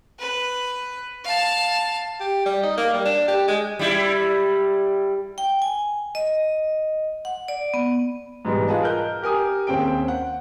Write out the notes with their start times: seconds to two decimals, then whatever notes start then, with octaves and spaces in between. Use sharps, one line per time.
0.19 B4
1.25 F5 A5
2.20 G4
2.45 G3
2.63 D#4
2.77 A#3
2.93 G3
3.05 D4
3.27 G4
3.47 G#3
3.79 G3 E4
5.38 G5
5.62 G#5
6.15 D#5
7.25 F#5
7.48 D5
7.74 B3
8.45 G#2 B2 E3 G3 G#3
8.68 F4 G#4 B4 D#5 A5
8.83 A#4 D#5 F#6 G6
9.22 G4 A#4 G#5 D#6
9.67 D#2 C4 C#4 G#4 G5 D7
10.08 F#5